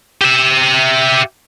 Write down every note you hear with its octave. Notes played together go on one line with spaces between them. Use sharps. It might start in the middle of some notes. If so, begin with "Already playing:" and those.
G4 E5